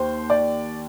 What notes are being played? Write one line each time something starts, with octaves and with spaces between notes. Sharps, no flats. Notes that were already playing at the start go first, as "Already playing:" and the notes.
Already playing: D#2 C5
D5